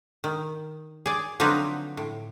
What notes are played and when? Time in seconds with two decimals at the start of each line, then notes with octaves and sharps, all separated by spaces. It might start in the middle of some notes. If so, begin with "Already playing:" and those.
0.24 D#3
1.06 G#4 D5
1.40 D3 F3 F#3 C4 D#4 B4
1.97 A2